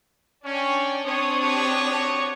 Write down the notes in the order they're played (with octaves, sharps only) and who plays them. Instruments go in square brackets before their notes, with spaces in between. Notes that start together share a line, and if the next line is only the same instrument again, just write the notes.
[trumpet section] C#4 [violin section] D4 D5 G5
[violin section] C4 D4 D#6 [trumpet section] C#5
[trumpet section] F#4 G4 C#5